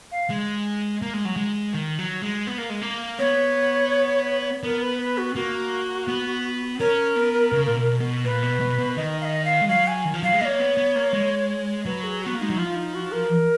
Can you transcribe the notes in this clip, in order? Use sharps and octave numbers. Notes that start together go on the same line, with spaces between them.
F5
G#3
A#3
G#3
F#3
G#3
D#3
F#3
G#3
B3
A#3
G#3
A#3
B3 C#5
B3 A#4
B4
B4
F#4
A#3 F#4
B3
C#4 A#4
B3
C#3
A#2
B2
B2
A#2 B4
B2
B2
B2
D#3 D#5
F5
D#5
F5
G#3
F#3 F5
G#5
D#3
F3
F#3 F5
G#3
A#3 C#5 D#5
B3
B3
A#3
G#3
F#3 B4
G#4
B3 F#4
A#3
G#3 D#4
F#3
F3 F4
D#4
F#4
A#4